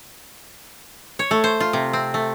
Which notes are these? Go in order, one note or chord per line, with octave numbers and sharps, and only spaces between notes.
C#5
A3
C5
F4
C3
C4
A3